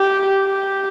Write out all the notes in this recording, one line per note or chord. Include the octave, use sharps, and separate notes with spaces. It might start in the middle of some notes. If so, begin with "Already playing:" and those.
Already playing: G4
G4